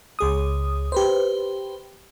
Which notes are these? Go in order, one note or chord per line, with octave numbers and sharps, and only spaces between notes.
C#2 G#4 D#6
G4 B4 C5